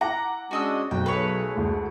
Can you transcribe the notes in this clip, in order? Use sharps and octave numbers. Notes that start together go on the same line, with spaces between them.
E4 F#5 A#5 D6
G#3 C#4 D4 F#4 D#5 E6
B1 G#2 F#4 G5
A3 G#4 B4 C#5
D2 G#3 E4